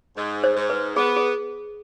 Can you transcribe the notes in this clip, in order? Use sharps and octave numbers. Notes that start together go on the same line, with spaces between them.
G#2
C5
G#2
B4
B3 G#4
G#4